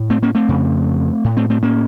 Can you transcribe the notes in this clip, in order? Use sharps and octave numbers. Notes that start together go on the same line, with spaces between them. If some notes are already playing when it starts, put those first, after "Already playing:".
Already playing: A2
A3 C4
A#3 C#4
A3 C4
F2 C#3
A2
A3 C4
A3 C4
A#3 C#4